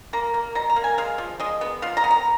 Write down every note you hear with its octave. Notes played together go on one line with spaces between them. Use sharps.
A#3 A#5
A#3
B2 A#5
A#5
A#3
G#5
G#3 F5
F3
G#3 D#5
B3
F3 F5
A#5
B3
A#5